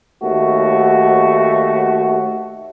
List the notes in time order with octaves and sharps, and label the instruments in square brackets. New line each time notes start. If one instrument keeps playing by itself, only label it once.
[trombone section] D#2 A3 F#4